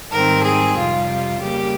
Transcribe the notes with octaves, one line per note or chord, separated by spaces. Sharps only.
G#2 D#3 G3 C4 A#4
G#4
F2 C3 G3 F4
C#3 G3 A#3 G4